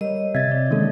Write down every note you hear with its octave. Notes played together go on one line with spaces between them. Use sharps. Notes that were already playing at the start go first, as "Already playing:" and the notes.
G3 A#4 C#5 D#5
C3 E5 G#6 A6
C#5 D5
D#3 G#3 A#3 C#4 A4